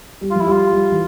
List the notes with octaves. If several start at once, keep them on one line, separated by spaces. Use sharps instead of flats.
G3
F3 F4
E4
G3
F4
G3
E3